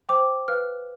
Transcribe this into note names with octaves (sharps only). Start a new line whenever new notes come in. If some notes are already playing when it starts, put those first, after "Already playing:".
C5 G5 D6
B4 F5 F6